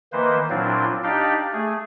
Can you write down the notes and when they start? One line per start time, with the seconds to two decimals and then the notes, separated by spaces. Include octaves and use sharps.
0.13 D#3 E3 A#3 B4 C5
0.50 A#2 F#3 C4 D4 E4 F4
1.03 D4 D#4 G4 D5 F5 G5
1.53 A3 G#4